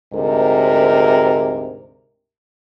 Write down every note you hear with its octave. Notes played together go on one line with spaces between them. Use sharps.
D2 G#2 C3 A#4